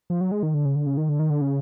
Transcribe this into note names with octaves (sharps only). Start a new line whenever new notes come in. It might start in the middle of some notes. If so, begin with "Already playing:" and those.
F3
F#3
G#3
D#3
D3
C#3
D3
C#3
D#3
D3
D#3
D3
C#3